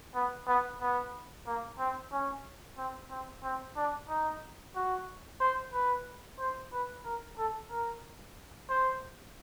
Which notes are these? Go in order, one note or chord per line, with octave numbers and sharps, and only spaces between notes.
B3
B3
B3
A#3
C4
C#4
C4
C4
C4
D4
D#4
F#4
C5
B4
C5
B4
A#4
A4
A#4
C5